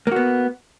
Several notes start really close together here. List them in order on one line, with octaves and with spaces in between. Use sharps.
A#3 F#4 B3